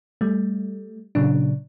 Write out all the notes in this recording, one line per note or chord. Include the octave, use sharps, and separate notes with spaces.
G3 A3
A#2 C#3 F#3 D4